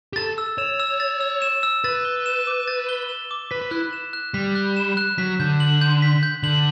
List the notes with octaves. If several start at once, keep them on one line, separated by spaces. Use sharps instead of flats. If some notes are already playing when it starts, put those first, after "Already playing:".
G4
A4 A6
E6
C#5 E7
E6
A6
E6
E7
E6
B4 A6
G7
E7
D6
A6
G7
E7
D6
B4 B6
B4
E4 F#6
E7
F#6
G3 B6
F#6
E7
F#6
F#3 B6
D3 G6
F#7
G6
B6
G6
D3 F#7